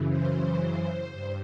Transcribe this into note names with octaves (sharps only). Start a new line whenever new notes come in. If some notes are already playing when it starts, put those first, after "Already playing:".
Already playing: F#2 C#3 E3
C5
G2